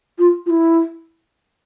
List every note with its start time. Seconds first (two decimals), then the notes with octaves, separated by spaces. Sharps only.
0.19 F4
0.46 F4
0.50 E4